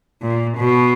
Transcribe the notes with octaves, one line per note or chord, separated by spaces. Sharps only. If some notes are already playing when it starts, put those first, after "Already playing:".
A#2
B2